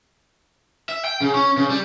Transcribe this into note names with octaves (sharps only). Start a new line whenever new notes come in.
E5
G5
C#3
C#4
C#3
G3